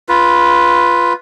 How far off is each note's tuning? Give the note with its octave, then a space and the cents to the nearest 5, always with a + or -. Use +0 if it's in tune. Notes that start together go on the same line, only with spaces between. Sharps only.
F4 +0 B4 -5